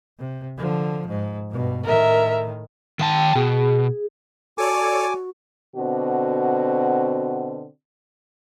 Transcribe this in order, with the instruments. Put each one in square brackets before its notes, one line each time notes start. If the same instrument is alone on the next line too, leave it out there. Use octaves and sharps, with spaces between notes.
[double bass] C3
D3 F3
G#2
G2 B2
[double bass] A2 D#3 [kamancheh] A#4 E5
[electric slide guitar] D#3 E5 A5 [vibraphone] G5
[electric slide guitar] B2 [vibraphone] G#4
[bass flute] F#4 [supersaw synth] A4 C#5 D5 [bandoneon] G#5 D6
[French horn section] B2 D3 C4 F#4